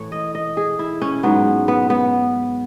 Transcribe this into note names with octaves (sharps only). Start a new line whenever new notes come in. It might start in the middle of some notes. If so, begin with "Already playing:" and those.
Already playing: A2 E3 C#5
D#5
D#5
G#4
E4
C#4
G#2 F#3 B3
B3
B3